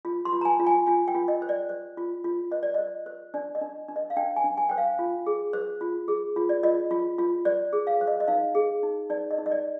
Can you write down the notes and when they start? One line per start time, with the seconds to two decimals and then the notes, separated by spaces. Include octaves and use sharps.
0.05 F4
0.25 C6
0.32 F4
0.41 A#5
0.45 G#5
0.60 F4
0.67 G#5
0.87 F4 G#5
1.08 G5
1.15 F4
1.28 D#5
1.42 C5
1.49 D5
1.69 C5
1.97 F4
2.24 F4
2.52 C5 D#5
2.63 D5
2.74 C5 D#5
3.06 C5
3.34 D4 D5
3.55 D#5
3.61 D4
3.88 D4
3.96 D#5
4.10 F5
4.16 D4 G5
4.36 G#5
4.44 D4
4.57 G#5
4.69 C5 G5
4.78 F5
4.99 F4
5.26 G#4
5.53 C5
5.81 F4
6.08 G#4
6.36 F4
6.49 D5
6.63 F4 D#5
6.91 F4
7.18 F4
7.45 C5 D5
7.73 G#4
7.87 F5
8.01 C5
8.07 D#5
8.20 D#5
8.28 D#4 F5
8.55 G#4
8.83 D#4
9.10 D#4 D5
9.31 D#5
9.38 D#4
9.46 D#5
9.52 D5